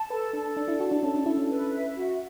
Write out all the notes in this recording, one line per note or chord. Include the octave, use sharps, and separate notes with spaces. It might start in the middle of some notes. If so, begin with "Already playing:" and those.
Already playing: A5
A4 B4
D4 A4
D4 D5
E4
F#4 A5
D4
C#4 A4
D4
E4 A4
C#4
B4
E5
F#4